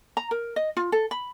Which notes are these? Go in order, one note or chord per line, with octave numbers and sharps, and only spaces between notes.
A#5
A#4
D#5
F4
A4
B5